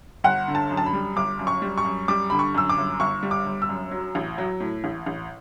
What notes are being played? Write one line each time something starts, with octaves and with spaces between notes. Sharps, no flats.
G1 F#5
D3
A5
F#2
A5
B5
G3
G1 D6
F#2
C#6
G3
C#6
F#2
G3 D6
D3 B5
C#6
F#2 E6
D6
G1
G1 C#6
G3
D6
G1
E6
F#2
F#3
A1
F#3
A2
A1
A1